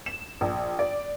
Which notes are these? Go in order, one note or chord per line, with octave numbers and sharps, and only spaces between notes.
E7
A#1
D5